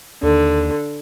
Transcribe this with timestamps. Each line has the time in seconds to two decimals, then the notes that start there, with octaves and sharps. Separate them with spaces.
0.23 D#2 D3